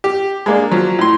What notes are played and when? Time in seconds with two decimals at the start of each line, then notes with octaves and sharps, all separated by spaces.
0.04 G4
0.46 G#3 A#3 D4
0.71 F3 F#3
0.99 A2 C6